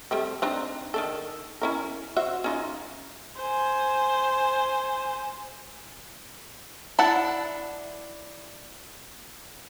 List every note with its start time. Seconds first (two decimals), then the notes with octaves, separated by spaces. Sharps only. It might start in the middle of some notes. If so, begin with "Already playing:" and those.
0.11 G3 A3 C4
0.42 C4 D4 D#4
0.94 D#3 D4 A4
1.62 C#4 E4 A#4
2.16 F#4 C5 E5
2.44 C#4 D#4 F4
3.36 C5 G#5
6.99 D4 E4 A4 F#5 A5